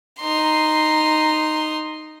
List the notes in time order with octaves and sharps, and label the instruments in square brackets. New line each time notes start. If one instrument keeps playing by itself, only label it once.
[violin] D#4 C6